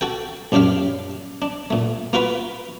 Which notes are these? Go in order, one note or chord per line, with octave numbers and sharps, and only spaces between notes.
F#4 A4 G5
A#1 F#2 D4 G4 F5
D4
A#2 A3
A#3 F4 F#4 B4